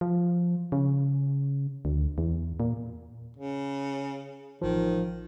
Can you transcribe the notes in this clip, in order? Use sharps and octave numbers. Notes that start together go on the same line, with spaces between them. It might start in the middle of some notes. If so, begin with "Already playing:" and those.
F3
C#3
D2
E2
A#2
C#3
A1 D#3 F3